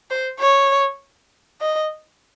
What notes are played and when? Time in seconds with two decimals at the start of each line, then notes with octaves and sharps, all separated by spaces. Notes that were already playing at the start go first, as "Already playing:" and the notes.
0.10 C5
0.40 C#5
1.61 D#5